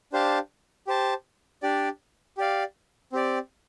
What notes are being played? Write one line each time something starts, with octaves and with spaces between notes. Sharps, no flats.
D4 G4 C5 F5 A5
G4 C5 A5
D4 G4 D5
G4 D5 F5
C4 G4 D5